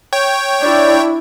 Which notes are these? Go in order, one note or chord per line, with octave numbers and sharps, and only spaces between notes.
C#5 G5
D4 E4 D5